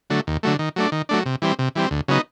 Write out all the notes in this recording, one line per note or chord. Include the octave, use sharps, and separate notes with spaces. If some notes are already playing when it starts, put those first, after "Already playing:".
D3 F#3 A3
D#2
D3 F#3 A3
D#3
F#3 A3 D4
D#3
F#3 A3 D4
C3
E3 G3 C4
C3
E3 G3 C4
D2
C#3 F#3 B3 D#4